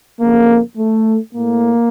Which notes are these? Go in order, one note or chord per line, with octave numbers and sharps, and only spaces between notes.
F2 C#3 A#3
A3
A2 A#3